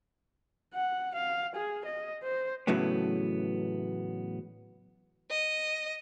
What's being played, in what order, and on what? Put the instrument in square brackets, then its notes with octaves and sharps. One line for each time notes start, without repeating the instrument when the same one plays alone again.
[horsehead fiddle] F#5
F5
G#4
D#5
C5
[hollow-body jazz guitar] A2 C#3 E3 F#3 A3 B3
[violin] D#5